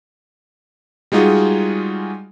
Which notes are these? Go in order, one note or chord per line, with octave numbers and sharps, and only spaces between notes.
G3 G#3 D#4 F4 F#4 G#4